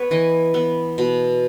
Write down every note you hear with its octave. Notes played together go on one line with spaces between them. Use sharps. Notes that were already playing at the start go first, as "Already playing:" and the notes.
Already playing: B3 B4 C#5
E3 D#5
B3
B2